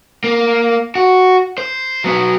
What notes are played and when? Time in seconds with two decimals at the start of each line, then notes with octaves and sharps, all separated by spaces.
0.24 A#3
0.95 F#4
1.58 C5
2.04 F#3 B3